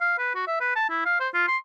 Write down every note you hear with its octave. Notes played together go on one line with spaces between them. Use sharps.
F5
B4
F#4
E5
B4
A5
E4
F5
C5
F4
C6